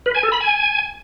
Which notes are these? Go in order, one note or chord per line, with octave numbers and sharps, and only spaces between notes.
B4
G#5
A4
B5
G#5